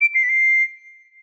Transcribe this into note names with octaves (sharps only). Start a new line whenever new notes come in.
D7
C7
B6
C7